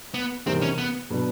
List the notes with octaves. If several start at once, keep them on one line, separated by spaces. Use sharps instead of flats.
B3
E2 C3 D#3 G3 C4
C#4
B3
B2 F#3 B3 D4